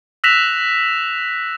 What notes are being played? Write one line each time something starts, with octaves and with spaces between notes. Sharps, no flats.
E6 F#6 A#6 B6 E7 F7